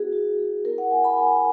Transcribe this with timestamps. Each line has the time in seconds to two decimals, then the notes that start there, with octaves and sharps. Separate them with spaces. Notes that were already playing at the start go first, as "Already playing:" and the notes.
Already playing: B3 E4 F#4 G#4
0.13 F#4
0.39 G#4
0.65 B3 E4 A#4
0.78 F#5
0.91 G#5
1.04 B5
1.18 G#5